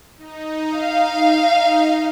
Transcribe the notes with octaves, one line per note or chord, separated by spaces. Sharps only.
D#4
F5